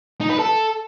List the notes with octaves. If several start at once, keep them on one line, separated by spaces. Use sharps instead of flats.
D#4
B4
A4